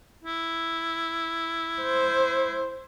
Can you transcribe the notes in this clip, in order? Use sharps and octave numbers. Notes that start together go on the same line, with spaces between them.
E4
C5